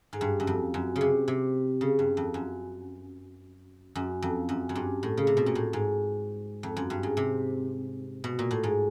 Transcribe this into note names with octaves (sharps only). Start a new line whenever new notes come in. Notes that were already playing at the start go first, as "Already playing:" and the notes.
G#2
G2
F#2
F2
F#2
C#3
C3
C3
C#3
G2
F2
F#2
F#2
F2
F#2
F#2
G2
A2
C#3
C3
B2
A#2
A2
G#2
F2
F#2
G2
G#2
C3
B2
A#2
A2
G#2